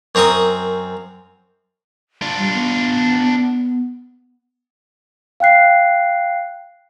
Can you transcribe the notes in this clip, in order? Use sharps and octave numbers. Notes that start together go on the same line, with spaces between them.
F#2 C4 A#4 C#6 D#6
D4 F4
G3
B3
F5 G5 F#6 C7